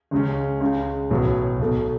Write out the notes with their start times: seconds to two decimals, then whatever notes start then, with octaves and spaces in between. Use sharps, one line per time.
0.11 C#2 C#3 G#3 C#4
0.61 C#2 C#3 G#3
1.10 B1 A2 F#3 B3
1.59 B1 B2 A3